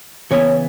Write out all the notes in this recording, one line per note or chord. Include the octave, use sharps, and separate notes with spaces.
C#3 E3 B3 E4 C#5